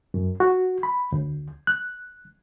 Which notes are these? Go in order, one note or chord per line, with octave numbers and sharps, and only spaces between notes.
F#2
F#4
B5
D2
F#6